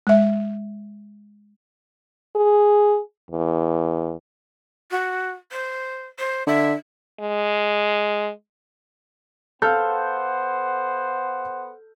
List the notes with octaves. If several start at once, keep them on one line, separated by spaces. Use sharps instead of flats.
G#3 E5
G#4
E2
F#4
C5
C5
D3 E5
G#3
B3 A4 C5 F5 F#5 F6 G6